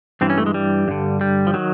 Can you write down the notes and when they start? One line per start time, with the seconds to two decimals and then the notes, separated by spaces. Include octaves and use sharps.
0.21 G2 E3 C4
0.30 C#4
0.38 A3
0.46 G#3
0.54 G3
0.88 G2 D3
1.21 G3
1.47 F3
1.54 D#3 F#3